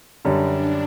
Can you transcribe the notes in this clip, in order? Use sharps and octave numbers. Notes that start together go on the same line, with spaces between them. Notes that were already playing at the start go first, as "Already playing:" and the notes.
F#2 D3 G3 D4